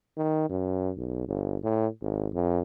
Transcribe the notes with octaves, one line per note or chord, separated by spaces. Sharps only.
D#3
F#2
B1
G1
A2
G#1
F2